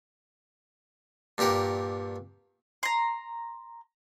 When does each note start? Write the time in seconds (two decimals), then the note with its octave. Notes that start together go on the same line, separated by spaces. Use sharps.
1.38 G2 A#2 G4 A#4 F#5
2.83 A#5 C6